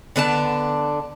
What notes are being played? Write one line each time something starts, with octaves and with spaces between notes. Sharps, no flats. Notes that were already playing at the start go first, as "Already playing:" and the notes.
D3 B3 D4 A5